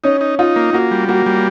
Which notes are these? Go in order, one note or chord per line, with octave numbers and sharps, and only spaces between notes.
C#4 D#4
D#4
D#4 F4
A#3
A#3 F#4
G3
A#3 F#4
G3